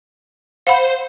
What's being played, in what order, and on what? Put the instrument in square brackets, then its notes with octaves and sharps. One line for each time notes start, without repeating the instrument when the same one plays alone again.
[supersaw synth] C5 [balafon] F5 F#5 B5